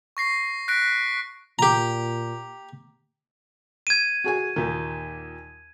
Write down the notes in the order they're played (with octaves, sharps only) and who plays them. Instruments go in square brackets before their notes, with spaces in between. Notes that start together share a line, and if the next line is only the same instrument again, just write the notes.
[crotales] C#6 A#6 C7
F#6 A#6 B6 D7
[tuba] A#2 [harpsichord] G4 A#5
[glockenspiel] G#6 D#7
[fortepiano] F#4 G#4 G#5
D#2 A#2 D#3